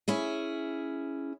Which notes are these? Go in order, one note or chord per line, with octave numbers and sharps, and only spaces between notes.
C#4 E4 G#4